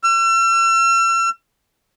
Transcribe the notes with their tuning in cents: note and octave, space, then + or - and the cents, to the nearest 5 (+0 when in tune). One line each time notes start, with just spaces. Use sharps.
E6 +40